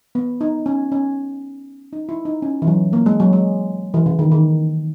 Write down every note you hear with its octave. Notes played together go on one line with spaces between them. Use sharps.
B3
D#4
C#4
C#4
D#4
E4
D#4
C#4
E3
F#3
A#3
G#3
F#3
G#3
E3
C#3
D#3
D#3